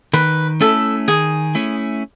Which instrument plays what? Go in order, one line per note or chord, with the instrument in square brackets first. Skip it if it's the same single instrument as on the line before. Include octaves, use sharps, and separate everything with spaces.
[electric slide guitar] D#3 [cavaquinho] B4
[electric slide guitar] A3 C#4 E4 [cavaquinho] A4
[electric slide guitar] D#3 [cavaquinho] G#4
[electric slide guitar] A3 C#4 E4